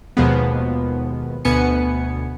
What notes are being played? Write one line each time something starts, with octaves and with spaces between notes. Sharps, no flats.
D#2 B2 F3 G#3 B3
D2 B2 B3 G#5 C#7